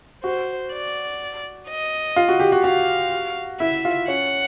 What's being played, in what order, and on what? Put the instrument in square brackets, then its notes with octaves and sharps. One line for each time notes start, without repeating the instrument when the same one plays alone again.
[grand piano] F#4 [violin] C5
[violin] D5
D#5
[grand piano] F4
F#4
G4
F#4
[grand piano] F#4 [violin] F5
[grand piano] E4 [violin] E5
[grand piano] F4
[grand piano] C#4 [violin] F#5